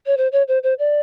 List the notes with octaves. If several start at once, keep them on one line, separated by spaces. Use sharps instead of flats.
C#5
C5
C#5
C5
C5
D5